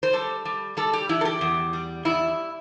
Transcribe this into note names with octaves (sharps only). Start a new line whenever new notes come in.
C5
G3 A4
G3
G3 A4
G4
E3 E4
A4
G4
E2
G3
E2 E4